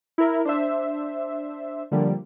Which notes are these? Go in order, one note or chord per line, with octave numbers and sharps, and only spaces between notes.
E4 A#4
D4 C5 E5
D3 F3 G3 A#3